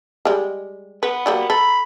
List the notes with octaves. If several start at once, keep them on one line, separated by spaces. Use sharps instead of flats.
G3 G#3
B3 B4
F#3 G3 A#3
A4 B5